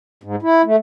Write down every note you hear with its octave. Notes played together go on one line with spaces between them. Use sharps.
G#2
E4
A3